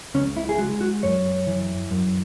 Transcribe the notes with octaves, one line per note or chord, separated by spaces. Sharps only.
C#2 C#4
E4
G#4
G#3 F#4
F#4
F#2 C#5
E3
F#2